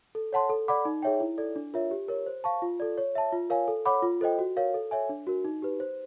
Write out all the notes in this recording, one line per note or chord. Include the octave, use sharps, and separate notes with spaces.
A4
C#5 F#5 A5 C6
A4
D5 F#5 B5 D6
D#4
G#4 C#5 E5 G5
E4
A4 D5
D4
F4 A#4 C#5 E5
G4
A#4 C#5
C5
F5 A5 C#6
F4
A4 D5
C#5
E5 A5
F4
A#4 C#5 F5 G#5
A4
C#5 F#5 B5 D6
F4
A4 C5 D#5 G5
F#4
A#4 C#5 F5
A4
C#5 E5 G#5
D4
F#4 A#4
D#4
G4 B4
C5